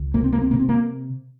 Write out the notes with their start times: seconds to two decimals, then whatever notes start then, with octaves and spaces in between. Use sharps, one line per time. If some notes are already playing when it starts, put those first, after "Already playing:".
Already playing: C#2
0.14 C3 A#3
0.24 C4
0.33 A#3
0.41 C4
0.51 C3 A#3
0.59 C4
0.69 A#3